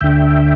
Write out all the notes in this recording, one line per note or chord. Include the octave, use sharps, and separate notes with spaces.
D2 D3 E5 G5